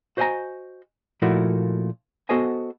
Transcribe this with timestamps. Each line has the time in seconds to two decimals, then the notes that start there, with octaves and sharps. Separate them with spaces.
0.17 F#4 C5 D#5 E5 G#5 A#5
1.22 A#2 F3 A3 A#3 E4 F#4
2.29 B3 F#4 A4 C5 D#5 G#5